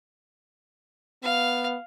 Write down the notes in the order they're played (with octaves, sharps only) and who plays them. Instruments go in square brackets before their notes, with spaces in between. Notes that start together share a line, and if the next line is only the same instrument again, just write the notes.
[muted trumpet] B3 [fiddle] F5